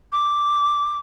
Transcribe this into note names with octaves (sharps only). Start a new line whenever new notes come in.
D6